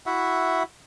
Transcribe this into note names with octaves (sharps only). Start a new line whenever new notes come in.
E4 F#4 E5 F#5